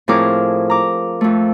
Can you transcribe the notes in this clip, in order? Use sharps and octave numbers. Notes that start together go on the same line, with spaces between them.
A2 F3 C4 G#4 A#4 D6
A#5 D6
F2 A3